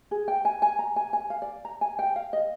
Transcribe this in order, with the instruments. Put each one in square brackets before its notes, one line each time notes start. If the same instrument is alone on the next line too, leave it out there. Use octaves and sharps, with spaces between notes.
[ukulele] G#4
G5
G#5
G#5
A#5
G#5
G#5
F5
D5
A#5
G#5
G5
F5
D#5